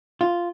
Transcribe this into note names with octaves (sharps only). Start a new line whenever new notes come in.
F4